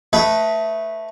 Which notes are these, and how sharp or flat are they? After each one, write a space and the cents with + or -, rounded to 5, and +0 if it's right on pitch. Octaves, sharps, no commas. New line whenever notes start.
A3 +0 B4 +0 D#5 +25